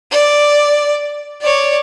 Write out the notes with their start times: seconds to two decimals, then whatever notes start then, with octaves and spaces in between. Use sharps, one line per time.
0.11 D5
1.41 C#5 D5